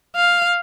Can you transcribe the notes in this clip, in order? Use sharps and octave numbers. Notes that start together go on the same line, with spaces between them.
F5